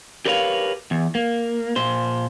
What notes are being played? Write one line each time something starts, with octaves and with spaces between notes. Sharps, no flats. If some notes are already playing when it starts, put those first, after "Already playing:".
G4 A#4 B4 C#5 E5 F5
E2
A#3
A#2 C5